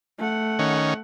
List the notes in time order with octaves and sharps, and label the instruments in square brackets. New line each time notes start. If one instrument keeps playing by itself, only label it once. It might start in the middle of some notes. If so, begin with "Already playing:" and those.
[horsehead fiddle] A3 F#5
[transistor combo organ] D#3 C#4